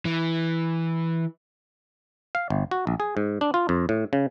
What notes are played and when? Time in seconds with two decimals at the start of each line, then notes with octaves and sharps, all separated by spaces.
0.05 E3
2.35 F5
2.50 G1
2.71 F#4
2.87 A#1
3.00 G#4
3.17 G#2
3.41 D4
3.54 F4
3.69 F2
3.89 A2
4.13 C#3